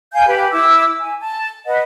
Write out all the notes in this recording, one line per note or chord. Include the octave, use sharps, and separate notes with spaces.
F5 G#5 G6
G4 B4 B5
E4 D6 E6
G#5
A5
B4 D#5 F#5